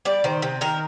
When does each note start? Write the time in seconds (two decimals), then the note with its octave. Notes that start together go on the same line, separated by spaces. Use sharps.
0.05 G3 D5
0.24 D#3 C5
0.42 C3
0.61 D#3 A#4